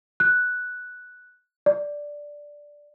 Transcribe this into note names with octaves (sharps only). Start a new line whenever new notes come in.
F#6
D5